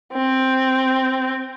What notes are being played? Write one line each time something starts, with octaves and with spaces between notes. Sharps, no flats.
C4